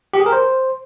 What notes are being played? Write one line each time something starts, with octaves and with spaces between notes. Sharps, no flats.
G4
G#4
A#4
C5